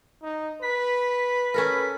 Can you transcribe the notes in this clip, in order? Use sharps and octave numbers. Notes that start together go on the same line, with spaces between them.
D#4
B4 B6
C#4 A4 A#4